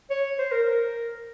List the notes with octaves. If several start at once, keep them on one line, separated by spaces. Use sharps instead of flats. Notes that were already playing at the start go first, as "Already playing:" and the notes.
C#5
C5
A#4
A#4